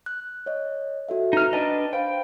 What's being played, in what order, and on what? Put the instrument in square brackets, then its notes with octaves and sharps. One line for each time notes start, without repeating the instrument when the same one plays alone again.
[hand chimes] F#6
C#5 D#5
F#4 A4 E5
[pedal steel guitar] D#4 F6 [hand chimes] B4 A#5
[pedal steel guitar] D4 B4 D#5 [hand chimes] G5 A5 A6
[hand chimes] C5 F5 B5 [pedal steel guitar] G5